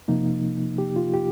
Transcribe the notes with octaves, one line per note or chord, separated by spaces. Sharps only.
C3 F3 A#3 D#4
G4
F4
G4